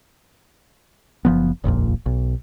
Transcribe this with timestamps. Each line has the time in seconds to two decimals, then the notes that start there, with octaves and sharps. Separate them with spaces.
1.25 F#1 F3 B3
1.64 D#1 A#1 F2 A#2
2.06 B1